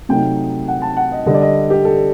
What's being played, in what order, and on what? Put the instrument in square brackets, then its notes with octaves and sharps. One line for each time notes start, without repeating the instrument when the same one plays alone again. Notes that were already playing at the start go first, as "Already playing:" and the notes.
[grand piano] C3 F#3 A3 D#4 G5
F#5
A5
F#5
D#5
D3 G3 D4 D#5
D5
D#5
G4
A4